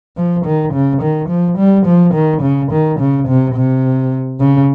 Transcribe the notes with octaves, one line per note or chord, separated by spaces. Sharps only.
F3
D#3
C#3
D#3
F3
G3
F3
D#3
C#3
D#3
C#3
C3
C3
C#3